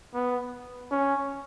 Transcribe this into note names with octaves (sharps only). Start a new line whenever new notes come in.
B3
C#4